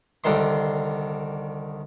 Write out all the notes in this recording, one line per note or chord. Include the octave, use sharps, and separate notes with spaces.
C2 D3 D#3 C6